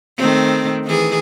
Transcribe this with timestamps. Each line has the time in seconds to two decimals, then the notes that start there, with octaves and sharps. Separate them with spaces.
0.18 D#3 A3 C4
0.85 D#3 E3 G#4